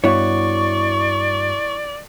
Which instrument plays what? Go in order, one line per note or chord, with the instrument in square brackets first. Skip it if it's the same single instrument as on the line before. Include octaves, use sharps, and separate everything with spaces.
[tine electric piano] G2 F#4 [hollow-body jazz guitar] B3 E4 C#5 [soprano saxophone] D5 [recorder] C#6